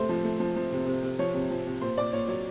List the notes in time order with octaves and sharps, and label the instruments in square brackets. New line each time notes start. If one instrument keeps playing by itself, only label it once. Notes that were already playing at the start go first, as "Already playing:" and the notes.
Already playing: [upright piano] C3 A3 C5
F3
A3
F3
F3
C3
C3
C3
F3 C#5
C3
F3
C3
A#2 C5
A#2 D5
A#2 C#5
F#3 C#5